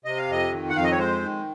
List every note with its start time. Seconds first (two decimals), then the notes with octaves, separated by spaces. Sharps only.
0.05 C3 D#5
0.18 F5
0.28 F2 D#5
0.52 D#3
0.69 F#5
0.75 F2 F5
0.84 D#5
0.92 C#5
0.98 G#3 C5
1.22 D#3